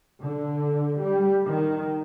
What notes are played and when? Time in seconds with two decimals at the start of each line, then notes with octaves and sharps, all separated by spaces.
0.23 D3
0.99 G3
1.48 D#3